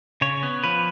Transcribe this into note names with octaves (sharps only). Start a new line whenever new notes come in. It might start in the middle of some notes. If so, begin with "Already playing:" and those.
C#3 C#5
B3
F3 B4